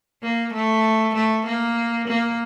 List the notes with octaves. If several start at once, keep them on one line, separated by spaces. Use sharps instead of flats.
A#3
A3
A3
A#3
A#3